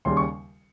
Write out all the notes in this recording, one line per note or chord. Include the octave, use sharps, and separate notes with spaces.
D#2 C#3 G3 C6
C#6